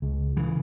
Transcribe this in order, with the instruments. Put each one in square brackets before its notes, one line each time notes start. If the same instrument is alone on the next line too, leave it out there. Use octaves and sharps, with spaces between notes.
[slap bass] C#2
C#3 E3